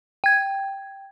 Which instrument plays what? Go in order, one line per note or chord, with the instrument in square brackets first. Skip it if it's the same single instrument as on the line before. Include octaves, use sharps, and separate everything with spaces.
[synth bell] G5 G#6